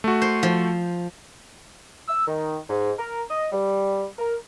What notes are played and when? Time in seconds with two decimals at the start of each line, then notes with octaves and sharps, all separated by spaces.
0.04 A3 F#4
0.22 C5
0.43 F3
2.08 E6
2.27 D#3
2.70 G#2
2.98 A#4
3.29 D#5
3.52 G3
4.19 A#4